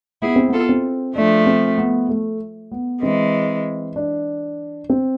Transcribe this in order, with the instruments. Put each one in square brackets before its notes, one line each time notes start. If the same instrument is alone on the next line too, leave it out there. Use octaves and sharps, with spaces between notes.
[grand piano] B3 [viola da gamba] E4 G#4
[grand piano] C4
[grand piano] B3 [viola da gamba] F4 A4
[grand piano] C4
[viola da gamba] F3 A3 [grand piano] D4
[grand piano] C4
B3
A3
B3
[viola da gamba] E3 G#3 [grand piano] C4
[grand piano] D4
C4